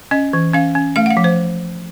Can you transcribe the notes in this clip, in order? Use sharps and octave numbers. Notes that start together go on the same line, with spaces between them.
C#4 D#5
E3
C#4 F5
C#4
A3 F5
F#5
F5
F3
C5